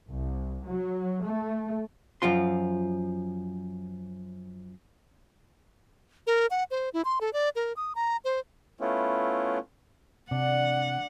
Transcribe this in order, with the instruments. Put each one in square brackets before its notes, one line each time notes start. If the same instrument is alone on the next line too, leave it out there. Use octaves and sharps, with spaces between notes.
[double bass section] C2
F#3
A3
[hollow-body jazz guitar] F#2 F3 F4 C6
[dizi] A#4
F#5
C5
E4
C6
A4
D5
A#4
D#6
A#5
C5
[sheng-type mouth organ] A3 B3 C#4 E4 F4
[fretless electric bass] C3 [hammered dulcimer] D4 [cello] F#5